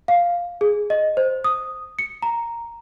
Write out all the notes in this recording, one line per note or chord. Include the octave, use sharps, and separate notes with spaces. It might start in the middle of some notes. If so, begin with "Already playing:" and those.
F5
G#4
D#5
C5
D#6
C#7
A#5